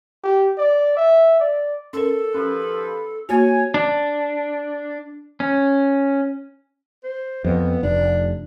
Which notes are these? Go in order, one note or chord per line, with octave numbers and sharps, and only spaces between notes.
G4
D5
E5
D5
C#4 A4 A#4
D#2 F3 C#4 B4
A#3 F#4 C#5 G#5
D4
C#4
C5
F2 B3
F1 D4